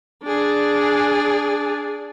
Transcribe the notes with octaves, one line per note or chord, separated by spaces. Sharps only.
D4 G#4